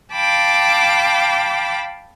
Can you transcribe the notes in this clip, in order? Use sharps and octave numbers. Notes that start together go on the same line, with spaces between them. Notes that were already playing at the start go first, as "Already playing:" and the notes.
F5 G5 A5 B5 D6